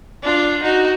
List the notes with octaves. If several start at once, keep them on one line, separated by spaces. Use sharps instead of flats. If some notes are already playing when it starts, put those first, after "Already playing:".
D4 F4
D#4 F#4